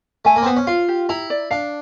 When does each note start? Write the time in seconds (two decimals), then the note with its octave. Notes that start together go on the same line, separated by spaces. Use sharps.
0.25 A3 G#5
0.36 A#3
0.42 C4
0.46 B3 C5
0.57 C#4
0.67 F4 F5
0.89 G4
1.09 E4 A#5
1.30 D5
1.50 D4 F5